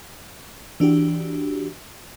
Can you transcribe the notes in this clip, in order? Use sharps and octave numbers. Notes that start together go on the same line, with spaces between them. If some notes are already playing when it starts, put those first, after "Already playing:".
E3 D4 F#4 G4